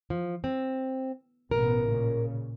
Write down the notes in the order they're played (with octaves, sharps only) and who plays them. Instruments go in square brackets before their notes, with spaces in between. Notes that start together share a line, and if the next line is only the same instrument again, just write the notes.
[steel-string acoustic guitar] F3
C4
[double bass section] A1 B2 B3 [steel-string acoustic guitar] A#4
[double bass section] A#2 C#3